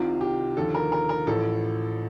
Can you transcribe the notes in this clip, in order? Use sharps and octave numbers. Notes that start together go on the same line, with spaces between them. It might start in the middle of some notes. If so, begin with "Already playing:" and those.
Already playing: C2 C3 D#3 F4
G4
D#2 D3 F3 A4
A#4
A#4
A#4
A1 A2 F3 A4